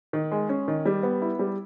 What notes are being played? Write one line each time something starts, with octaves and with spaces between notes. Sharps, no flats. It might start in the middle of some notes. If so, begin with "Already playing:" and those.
D#3
G#3
C#4
D#3
G3
B3
E4
G3